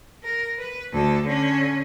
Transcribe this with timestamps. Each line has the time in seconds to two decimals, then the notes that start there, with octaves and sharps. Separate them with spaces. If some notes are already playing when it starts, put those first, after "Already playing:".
0.23 A#4
0.58 B4
0.93 D2 A4
1.26 D3 C#4